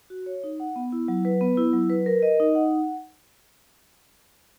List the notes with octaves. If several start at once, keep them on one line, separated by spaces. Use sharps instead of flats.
F#4
C#5
D#4
F#5
B3
E4
F#3
B4
B3
E4
F#3
B4
A#4
D#5
D#4
F#5